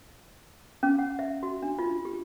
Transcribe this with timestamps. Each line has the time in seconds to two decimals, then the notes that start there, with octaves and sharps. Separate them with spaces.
0.83 C#4
0.99 F#5
1.19 E5
1.43 F#4
1.62 D4
1.79 F4
2.05 G4